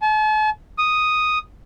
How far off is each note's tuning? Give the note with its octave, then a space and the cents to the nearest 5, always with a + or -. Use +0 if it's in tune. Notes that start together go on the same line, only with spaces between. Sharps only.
A5 -45
D#6 +0